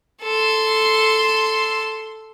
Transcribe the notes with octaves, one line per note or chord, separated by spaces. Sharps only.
A4 C6